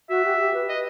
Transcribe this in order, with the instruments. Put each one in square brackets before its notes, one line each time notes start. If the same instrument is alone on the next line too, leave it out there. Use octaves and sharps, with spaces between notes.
[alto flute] F#4 [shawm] E5
[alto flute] G4
G4
B4
[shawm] D#5